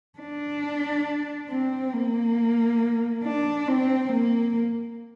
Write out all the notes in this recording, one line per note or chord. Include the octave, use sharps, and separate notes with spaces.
D4
C4
A#3
D4
C4
A#3